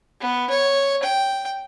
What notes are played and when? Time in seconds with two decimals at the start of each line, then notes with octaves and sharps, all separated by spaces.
0.20 B3
0.50 C#5
1.03 G5